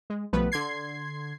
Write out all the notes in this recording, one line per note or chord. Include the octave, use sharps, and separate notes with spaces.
G#3
B1 F3 G3 A3 B3 B4
D3 C6 G#6 C7